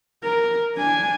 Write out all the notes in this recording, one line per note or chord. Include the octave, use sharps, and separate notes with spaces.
A#4
D4 G#5